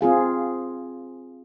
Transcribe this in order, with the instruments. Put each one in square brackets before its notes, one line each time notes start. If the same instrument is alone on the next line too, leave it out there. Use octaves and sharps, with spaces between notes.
[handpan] C4 F4 G#4 F5